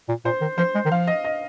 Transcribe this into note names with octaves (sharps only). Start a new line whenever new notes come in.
A#2
A#2 C5
D#3
F3 C5
G#3
D#3
F3 F5
D#5
D#5